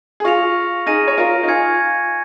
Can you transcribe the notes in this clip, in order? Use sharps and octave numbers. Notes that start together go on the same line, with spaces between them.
G#4
F4 C#6 A#6 C#7 F7
D#4 G#4 F6 A#6 D#7
C#5
F4 A#4
D#4
F4 G#5 C#6 G#6 C#7